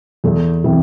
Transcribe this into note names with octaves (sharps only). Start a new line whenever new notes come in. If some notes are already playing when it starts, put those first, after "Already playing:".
E2 A4
E3 C4